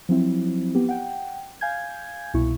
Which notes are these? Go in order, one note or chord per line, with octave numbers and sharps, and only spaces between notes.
F3 F#3 C4 E4
B3 G4
F#5 G5
F5 G#5 G6 G#6
C2 B2 E4 C#6